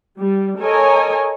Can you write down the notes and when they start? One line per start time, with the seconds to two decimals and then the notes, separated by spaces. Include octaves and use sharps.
0.18 G3
0.60 A4 A#4 C#5 D#5 G#5 A#5